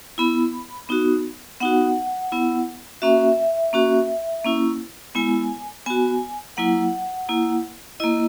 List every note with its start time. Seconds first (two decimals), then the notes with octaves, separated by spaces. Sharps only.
0.18 B3 E4 B5
0.89 B3 D#4 F#4
1.61 B3 D#4 F#4 F#5
2.32 B3 E4
3.02 A#3 C#4 F#4 E5
3.73 A#3 C#4 F#4
4.45 A#3 C#4 E4
5.15 G#3 B3 E4 G#5
5.86 B3 F#4 G#5
6.57 F#3 A#3 E4 F#5
7.29 A#3 E4
8.00 A#3 E4 D#5